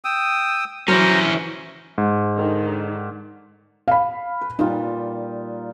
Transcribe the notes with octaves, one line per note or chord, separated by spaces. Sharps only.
G5 D#6 E6
E3 F#3 C#4 C5 A#5
G#2
D3 D#3
F5 B5
B4
A#2 G3 D#4 F4